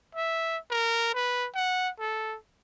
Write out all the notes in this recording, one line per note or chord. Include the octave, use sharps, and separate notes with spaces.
E5
A#4
B4
F#5
A4